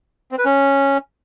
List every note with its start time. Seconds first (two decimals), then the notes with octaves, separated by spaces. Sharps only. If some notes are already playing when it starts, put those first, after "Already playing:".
0.32 C4
0.38 B4
0.45 C#4